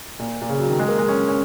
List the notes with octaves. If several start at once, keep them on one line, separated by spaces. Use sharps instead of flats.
A#2
A#2
C#3
F#3
D#3
G#3
A#3
G#3
C#4
C#4